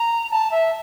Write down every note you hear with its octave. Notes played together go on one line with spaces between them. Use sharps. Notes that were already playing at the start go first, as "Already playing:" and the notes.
Already playing: A#5
A5
E5